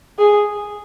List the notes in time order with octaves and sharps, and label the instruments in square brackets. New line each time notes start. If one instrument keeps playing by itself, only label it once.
[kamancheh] G#4